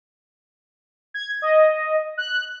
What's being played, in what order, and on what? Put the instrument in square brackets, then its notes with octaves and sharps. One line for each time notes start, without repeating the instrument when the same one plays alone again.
[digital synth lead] G#6
D#5
F#6